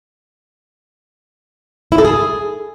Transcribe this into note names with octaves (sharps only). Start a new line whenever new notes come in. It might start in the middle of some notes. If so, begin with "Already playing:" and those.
E4
A4
G#4